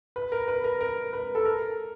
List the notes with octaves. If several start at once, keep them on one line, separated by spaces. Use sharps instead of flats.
B4
A#4
B4
A#4
A#4
B4
A4
A#4